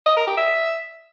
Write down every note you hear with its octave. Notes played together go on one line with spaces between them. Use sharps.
D#5
A#4
G4
E5